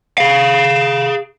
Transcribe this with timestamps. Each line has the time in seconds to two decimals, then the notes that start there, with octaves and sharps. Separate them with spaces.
0.18 G#4 F5